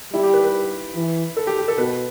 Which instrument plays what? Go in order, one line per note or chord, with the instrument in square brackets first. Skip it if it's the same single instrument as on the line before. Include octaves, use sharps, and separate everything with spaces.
[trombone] G3 [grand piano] E4
[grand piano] G4
B4
B4
[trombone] E3
[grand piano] A4
G4
G4
A4
[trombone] B2 [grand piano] B4